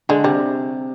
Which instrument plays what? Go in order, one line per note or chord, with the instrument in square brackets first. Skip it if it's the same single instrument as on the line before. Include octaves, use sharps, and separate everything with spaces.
[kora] D3 [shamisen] G#3
[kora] C3 [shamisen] G3